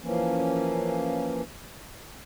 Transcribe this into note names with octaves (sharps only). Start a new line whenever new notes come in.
E3 F3 A#3 C#4